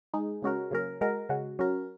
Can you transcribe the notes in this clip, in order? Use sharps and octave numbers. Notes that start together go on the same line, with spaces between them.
G#3 D#4 G#4
C#3 G#3 C#4 F#4 A#4
C#3 F#3 A#3 C#4 A#4
G#3 F#4 A#4
C#3 G#3 F#4
F#3 C#4 F#4 A#4